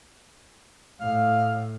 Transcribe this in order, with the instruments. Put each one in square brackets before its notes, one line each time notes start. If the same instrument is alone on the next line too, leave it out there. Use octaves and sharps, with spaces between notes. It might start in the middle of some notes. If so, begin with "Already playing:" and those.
[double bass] A2 [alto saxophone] F5